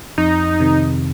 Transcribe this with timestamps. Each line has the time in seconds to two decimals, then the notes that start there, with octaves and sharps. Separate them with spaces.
0.18 F2 D#4
0.60 C3 D#3